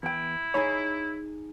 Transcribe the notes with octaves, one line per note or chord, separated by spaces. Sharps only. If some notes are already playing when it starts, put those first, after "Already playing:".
E2 E4 G5
D#4 G#4 C#5 B5